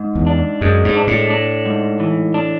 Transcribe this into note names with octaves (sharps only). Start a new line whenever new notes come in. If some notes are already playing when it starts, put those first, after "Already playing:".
Already playing: G#2
E2
D4
F#2 G#3
G#2
D4
A2
D4
G#2
E3
D4